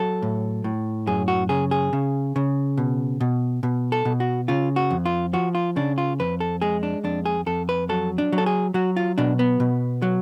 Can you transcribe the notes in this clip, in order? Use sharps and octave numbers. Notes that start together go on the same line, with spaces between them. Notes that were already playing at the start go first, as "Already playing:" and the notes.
Already playing: F#3 A4
A2
A2
F#2 G#4
F#4
C#3 G#4
G#4
C#3
C#3
B2
B2
B2
A4
B2
F#4
C#3 F4
F#4
F2
F4
F3 F#4
F4
C#3 D4
F4
F2 B4
A4
G#3 G#4
D4
F2 D4
G#4
F2 A4
B4
F#3 A4
D4
F#3
A4
G#4
F#3 F#4
F4
B2 D4
B3
B2
F#3